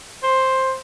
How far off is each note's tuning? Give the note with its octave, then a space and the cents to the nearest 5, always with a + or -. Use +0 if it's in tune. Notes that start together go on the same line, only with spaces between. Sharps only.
C5 +10